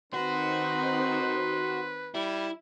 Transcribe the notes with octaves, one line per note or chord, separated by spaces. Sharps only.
D#3 C4 D#4 F#4 B4 C6
G3 E4